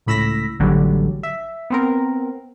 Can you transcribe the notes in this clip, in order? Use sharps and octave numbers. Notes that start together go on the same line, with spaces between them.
C#2 A2 B5 E6 A#6 B6
A1 D3 F#3 G3
E5
B3 C4 A#4